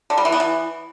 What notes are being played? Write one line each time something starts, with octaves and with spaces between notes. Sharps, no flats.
D3
G3
E3
B3
E3